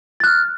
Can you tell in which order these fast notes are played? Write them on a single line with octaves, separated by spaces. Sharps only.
A6 F#6 F6